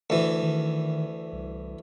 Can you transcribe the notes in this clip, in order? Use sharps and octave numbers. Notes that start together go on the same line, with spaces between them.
D2 E3
D#3
C2